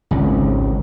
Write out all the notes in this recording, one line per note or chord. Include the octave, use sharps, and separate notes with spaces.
G#1 C#2